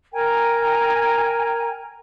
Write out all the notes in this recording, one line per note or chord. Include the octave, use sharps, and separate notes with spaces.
A#4 G5 G#5 A#5